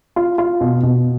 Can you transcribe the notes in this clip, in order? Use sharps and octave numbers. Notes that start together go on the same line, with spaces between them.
F4
F4
B2
B2